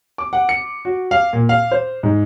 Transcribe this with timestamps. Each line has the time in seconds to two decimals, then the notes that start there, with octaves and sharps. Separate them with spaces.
0.18 D6
0.33 F#5
0.49 C#7
0.85 F#4
1.11 F5
1.33 A#2
1.49 F5
1.71 C5
2.03 G#2